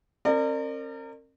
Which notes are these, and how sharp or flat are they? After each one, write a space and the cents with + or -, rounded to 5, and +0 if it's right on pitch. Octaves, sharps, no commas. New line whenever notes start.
C4 +45 A#4 -30 D5 +35